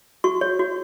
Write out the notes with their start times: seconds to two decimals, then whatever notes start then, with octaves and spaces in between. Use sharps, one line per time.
0.24 F#4 C#6
0.41 C#5
0.59 F#4